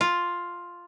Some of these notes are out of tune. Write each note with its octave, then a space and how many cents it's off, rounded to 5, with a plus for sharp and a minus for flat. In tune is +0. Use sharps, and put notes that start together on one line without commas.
F4 +5